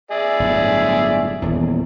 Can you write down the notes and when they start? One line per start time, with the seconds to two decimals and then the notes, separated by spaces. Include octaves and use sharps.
0.11 G#4 D5 E5
0.40 G1 A2 F#3
1.42 D#1 E2